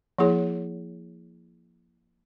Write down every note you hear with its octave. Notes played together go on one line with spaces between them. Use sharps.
F3 A#3 E4 G#4 C#5